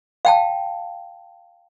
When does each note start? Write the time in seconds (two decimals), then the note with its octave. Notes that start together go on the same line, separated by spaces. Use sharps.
0.25 F5 G5 A5